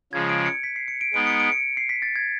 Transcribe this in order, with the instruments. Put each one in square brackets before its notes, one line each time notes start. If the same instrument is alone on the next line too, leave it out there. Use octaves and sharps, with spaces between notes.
[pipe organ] C#3 F3 G#3 [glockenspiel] G#6
[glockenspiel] D7
C#7
B6
C7
C#7
D7
[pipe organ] G#3 B3 D#4 [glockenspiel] D7
[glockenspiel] C#7
D7
C#7
C7
B6
A6
G#6